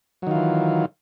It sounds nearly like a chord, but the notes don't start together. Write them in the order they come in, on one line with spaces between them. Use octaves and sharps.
F#3 D#3 F4 E3